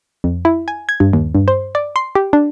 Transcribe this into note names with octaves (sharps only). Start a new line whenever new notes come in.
F2
E4
G#5
G#6
G2
D#2
G2
C5
D5
C6
G4
D4